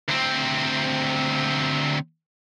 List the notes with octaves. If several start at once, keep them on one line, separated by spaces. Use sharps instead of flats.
D2 C4